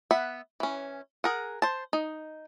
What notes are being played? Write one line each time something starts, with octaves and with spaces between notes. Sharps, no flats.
B3 E5 F#5
E3 C#4
G#4 A#4 F#5
C5 A5
D#4